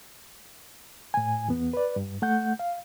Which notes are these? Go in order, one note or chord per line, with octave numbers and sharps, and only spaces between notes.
A2 G#5
E2 B3
B4 D5
G2
A3 F#5 G6
F5